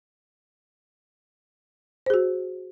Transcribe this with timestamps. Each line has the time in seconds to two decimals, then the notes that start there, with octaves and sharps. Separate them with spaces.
2.06 C5
2.10 G#4
2.14 F#4